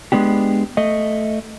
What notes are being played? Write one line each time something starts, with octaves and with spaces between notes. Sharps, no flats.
G#3 B3 D4 G4
A3 D#5